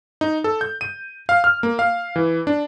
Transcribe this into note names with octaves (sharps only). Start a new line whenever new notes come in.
D#4
A4
G6
D#7
F5
F6
A#3
F5
E3
D4